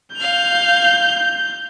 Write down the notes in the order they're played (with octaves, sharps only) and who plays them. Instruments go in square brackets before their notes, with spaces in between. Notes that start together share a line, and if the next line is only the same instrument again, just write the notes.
[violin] F5 F7 [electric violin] G6